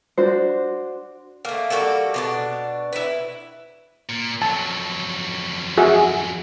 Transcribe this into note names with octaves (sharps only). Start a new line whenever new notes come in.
D4 F#4 C5
A3 A#3
G3 A#3 F#4 A4
B2 D4 A5
E4 B4
A#2
F2 F#3 A5
F#4 G#4 E5